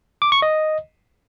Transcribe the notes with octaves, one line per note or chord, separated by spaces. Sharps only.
D6
C#6
D#5